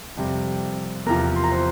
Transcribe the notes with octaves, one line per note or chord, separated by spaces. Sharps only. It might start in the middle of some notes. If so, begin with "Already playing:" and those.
F2 C3 G3
E2 C3 F3 A#4 A#5
C6
A#5
C5 C6